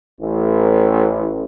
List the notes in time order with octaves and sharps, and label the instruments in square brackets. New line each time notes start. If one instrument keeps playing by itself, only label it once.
[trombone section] A1